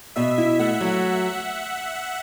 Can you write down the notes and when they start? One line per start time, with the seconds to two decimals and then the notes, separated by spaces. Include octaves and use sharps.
0.16 B2 E5
0.38 E4
0.59 A3 F#5
0.81 F#3